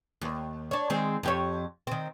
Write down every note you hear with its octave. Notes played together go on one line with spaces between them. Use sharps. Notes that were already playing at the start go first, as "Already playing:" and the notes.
D#2
D4 C#5
D#3 G#3 C4
F2 G4 C#5
D#3 C4